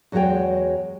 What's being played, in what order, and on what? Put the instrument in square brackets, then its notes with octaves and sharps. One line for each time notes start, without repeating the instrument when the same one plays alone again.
[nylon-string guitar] E2 F#3 G#3 F#4 C#5 G5